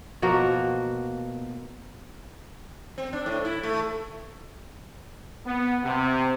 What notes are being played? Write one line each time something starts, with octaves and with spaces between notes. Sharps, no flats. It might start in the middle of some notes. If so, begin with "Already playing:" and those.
B2 F3 A#3 F#4
C4
D4
A2
E4
A3
B3
C3